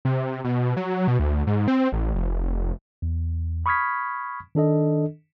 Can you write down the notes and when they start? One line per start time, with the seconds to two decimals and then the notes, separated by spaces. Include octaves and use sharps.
0.05 C3
0.44 B2
0.77 F#3
1.08 B2
1.19 D2
1.47 G#2
1.68 C4
1.92 A1
2.14 F1
3.02 E2
3.66 B5 C#6 D#6 F6 G#6 B6
4.55 D#3 D4 A4 D#5